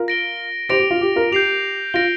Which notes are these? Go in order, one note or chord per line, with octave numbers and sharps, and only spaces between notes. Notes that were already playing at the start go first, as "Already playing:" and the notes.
Already playing: F4 A#4
A#6 D7 G7
G4 C5 A#6 D7 F7
G4
F4
G4
F4 A#4
G4 G6 C7 F7
F4 A#6 D7 G7